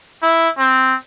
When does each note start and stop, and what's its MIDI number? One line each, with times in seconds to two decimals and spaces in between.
0.23 0.49 64
0.59 0.95 60